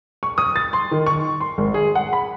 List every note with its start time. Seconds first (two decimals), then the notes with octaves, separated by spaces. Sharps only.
0.23 C#6
0.38 D#6
0.56 A6
0.73 C6
0.91 D#3
1.07 C#6
1.41 C6
1.58 G#1
1.74 G#4
1.95 F#5
2.13 B5